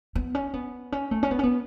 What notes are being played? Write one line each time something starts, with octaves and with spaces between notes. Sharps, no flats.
B3
C#4
B3
C#4
A3
C#4
B3
C#4
B3